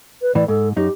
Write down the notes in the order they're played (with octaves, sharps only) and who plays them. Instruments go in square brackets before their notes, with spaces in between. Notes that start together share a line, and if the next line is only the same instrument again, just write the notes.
[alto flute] B4
[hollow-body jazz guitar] A2 E3 [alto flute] D5
[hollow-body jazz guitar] G#2 [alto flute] A4
[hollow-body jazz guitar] F#2 D#4 [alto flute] G4